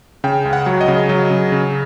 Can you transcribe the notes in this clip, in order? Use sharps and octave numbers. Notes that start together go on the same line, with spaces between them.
C#3 G5
C#2
F#5
F#3
D#5
C#3
F#3
C#3
C#3